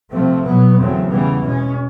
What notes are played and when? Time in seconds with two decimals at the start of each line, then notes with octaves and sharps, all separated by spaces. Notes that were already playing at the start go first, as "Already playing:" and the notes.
0.11 C3 F3 A3 C4
0.45 B2 F#3 B3
0.77 E2 C#3 F#3 A3 C4
1.10 C#3 E3 G3 B3
1.44 B2 G#3 C#4